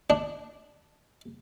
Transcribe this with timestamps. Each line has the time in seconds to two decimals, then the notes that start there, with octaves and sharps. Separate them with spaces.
0.10 D4